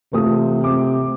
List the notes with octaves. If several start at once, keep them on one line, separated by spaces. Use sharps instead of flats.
C3 E3 A3 F4 D#6
A3 C4 D6